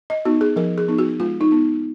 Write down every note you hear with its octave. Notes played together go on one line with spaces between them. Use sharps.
D#5
B3 D#4 F#4
G#4
F3 A#4
G#4
B3 D#4
F#4
G#3 F4
D#4
B3 D#4